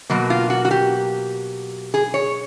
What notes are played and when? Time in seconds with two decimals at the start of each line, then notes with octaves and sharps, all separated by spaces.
0.10 B2 F#3 A#3
0.30 F4
0.50 F#4
0.65 F#4
0.71 G4
1.94 G#4
2.14 C#5